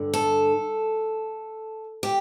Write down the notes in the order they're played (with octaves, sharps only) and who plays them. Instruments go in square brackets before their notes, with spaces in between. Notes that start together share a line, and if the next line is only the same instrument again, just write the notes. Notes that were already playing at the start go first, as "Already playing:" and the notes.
Already playing: [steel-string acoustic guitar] G2 D3
A4
G4